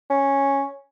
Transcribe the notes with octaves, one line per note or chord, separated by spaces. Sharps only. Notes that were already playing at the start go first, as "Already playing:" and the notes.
C#4